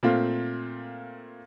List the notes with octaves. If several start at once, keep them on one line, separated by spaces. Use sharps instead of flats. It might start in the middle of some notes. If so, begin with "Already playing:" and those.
A#2 A3 C4 F4